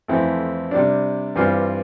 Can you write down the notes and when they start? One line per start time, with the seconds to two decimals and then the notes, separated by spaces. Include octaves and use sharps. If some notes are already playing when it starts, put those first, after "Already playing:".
0.08 F2 E3 A3 C4 E4
0.71 C3 G3 D4
1.36 G2 E3 G3 C4 F4